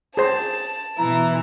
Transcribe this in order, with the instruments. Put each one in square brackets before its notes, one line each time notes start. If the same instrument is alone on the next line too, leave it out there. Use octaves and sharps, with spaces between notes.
[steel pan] G#4 C5 [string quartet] A5
[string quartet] B2 E3 E4 [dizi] A#5